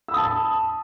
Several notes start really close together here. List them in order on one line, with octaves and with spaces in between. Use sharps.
E6 B5 D#6 A5